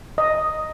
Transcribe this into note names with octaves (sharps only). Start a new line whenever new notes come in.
D#5